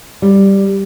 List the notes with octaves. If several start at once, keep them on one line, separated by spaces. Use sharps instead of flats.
G3